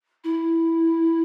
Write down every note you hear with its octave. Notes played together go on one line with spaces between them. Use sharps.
E4